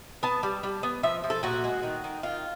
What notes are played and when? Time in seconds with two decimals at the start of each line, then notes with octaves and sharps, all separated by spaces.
0.23 B3 A5
0.43 G3
0.63 G3
0.83 B3
1.03 F3 E5
1.24 F3
1.30 A4
1.43 A#2 F#4
1.64 G#3
1.83 D#3
2.04 D#3
2.23 D#3 F4